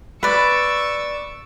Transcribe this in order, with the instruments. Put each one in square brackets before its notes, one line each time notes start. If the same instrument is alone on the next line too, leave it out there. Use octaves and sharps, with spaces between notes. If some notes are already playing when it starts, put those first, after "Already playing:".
[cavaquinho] B4 D5 [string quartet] C#6 D6 E6